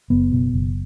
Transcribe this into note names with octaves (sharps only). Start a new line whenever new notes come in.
F#1 B3
B2
F#1